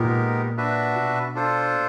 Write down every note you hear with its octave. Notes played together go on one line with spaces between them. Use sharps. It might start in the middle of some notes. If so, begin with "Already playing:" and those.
Already playing: A#2 G#3 B3 D#4 G4 A#4
D4 F#4 B4 E5
B2
D4 F4 A4 C5
A#2